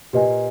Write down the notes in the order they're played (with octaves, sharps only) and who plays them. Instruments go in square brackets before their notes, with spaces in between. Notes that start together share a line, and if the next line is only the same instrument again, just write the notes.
[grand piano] A#2 [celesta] G4 B4 D#5 G#5